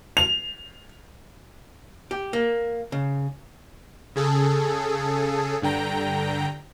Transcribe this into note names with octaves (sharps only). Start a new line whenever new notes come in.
F7
G4
A#3
C#3
C#3 G#4 A4
G2 D3 G5 A#5